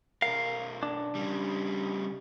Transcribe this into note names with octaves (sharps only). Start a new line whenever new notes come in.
B1 A#4 F5
D4
C#3 G3